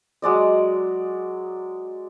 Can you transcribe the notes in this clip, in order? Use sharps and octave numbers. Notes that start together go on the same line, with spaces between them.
F#3 G#3 D5 D#5